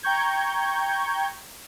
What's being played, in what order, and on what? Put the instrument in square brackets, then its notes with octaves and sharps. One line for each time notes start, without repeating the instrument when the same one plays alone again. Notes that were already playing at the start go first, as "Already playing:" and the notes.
[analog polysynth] G5 A#5 C#6 G6 G#6